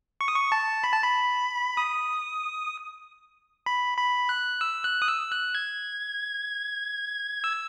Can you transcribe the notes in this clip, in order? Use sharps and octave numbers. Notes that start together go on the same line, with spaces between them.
C#6
D#6
C#6
A5
B5
A5
B5
D#6
B5
B5
F#6
E6
F#6
D#6
E6
F#6
G#6
E6